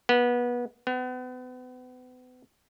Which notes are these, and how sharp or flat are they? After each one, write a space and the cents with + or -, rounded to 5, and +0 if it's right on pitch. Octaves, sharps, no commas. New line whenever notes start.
B3 -25
B3 +35